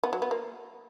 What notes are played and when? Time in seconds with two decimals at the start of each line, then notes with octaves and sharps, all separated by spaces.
0.03 B3
0.13 F#3
0.22 B3
0.31 A#3